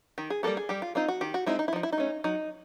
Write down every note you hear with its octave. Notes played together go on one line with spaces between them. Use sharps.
D#3 G4
G#4
G3 A#3 C#4 A4
G#4
G3 G4
F4
C4 D#4 F4
F#4
D#3 G4
F#4
G#3 C4 D#4 E4
D#4
E4
F3 D#4
E4
D#4
A3 C#4
F#3 D#4